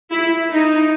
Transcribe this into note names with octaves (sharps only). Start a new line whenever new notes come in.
E4
D#4